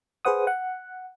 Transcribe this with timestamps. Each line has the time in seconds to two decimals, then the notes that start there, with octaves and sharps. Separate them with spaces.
0.25 G#4 B4 C5 F#5 D#6
0.47 F#5